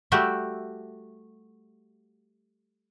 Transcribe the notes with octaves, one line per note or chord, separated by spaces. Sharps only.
G3 A3 F#4 G4 E5